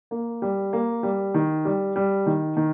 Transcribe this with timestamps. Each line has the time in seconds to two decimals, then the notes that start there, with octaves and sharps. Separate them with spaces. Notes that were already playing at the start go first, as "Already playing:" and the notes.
0.11 A#3
0.42 G3
0.73 A#3
1.03 G3
1.34 D#3
1.65 G3
1.96 G3
2.26 D#3
2.56 D#3